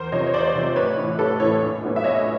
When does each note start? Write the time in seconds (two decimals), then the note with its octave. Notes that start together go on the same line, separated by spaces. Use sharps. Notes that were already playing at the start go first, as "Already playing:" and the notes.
Already playing: E2 A#4 C5
0.12 C3 F3 C#5 D#5
0.27 C#5
0.34 E2 C5 D5
0.55 C3 F3
0.76 A1 B4 C#5
0.97 A2 E3
1.19 A1 A4 B4
1.40 A2 E3 B4 C#5
1.62 A#1
1.84 A2 F#3 B3
1.96 E5
2.04 A#1 C#5 D#5